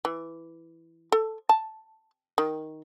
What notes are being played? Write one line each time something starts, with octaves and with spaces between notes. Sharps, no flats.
E3
A4
A5
D#3